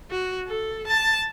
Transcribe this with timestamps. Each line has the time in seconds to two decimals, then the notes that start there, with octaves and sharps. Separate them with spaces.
0.11 F#4
0.47 A4
0.87 A5